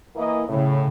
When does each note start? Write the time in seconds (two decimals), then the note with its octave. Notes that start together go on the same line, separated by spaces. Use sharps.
0.16 E3 A#3 D#5
0.48 A2 C#3